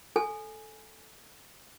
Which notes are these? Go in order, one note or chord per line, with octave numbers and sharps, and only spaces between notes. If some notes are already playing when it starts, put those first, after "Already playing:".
A4 G#5